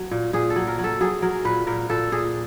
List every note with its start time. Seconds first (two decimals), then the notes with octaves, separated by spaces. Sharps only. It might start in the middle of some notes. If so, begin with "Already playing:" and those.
Already playing: F#3
0.11 A#2
0.33 A#2 G#4
0.50 A4
0.56 F#3
0.67 A#4
0.79 F#3
0.84 A4
1.01 F#3 G#4
1.22 F#3 A#4
1.45 A#2 B4
1.67 A#2 A#4
1.89 A#2 A4
2.12 A#2 G#4